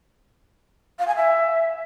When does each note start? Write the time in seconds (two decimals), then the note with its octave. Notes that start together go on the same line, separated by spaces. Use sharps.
0.99 F5
1.08 G#5
1.16 E5